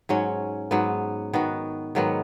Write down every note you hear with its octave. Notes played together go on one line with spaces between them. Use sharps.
G#2 F#3 C#4
G#2 F#3 B3
D#3 B3 F#4
G#2 D#3 F#3 B3